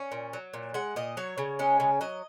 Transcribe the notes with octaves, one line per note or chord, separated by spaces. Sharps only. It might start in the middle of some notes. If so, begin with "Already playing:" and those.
Already playing: C#4
A#2
F#3
A#2
G#3 F#5
A#2 D#5
F#3 C#5
C#3
G#3 C#4
C#3
F#3 D#5